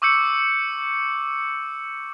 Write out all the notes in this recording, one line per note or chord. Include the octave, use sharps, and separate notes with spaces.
C#6 D6 E6 G6 C#7